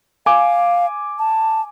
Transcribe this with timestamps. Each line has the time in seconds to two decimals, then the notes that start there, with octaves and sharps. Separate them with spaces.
0.26 F5 G#5 D6
1.19 A5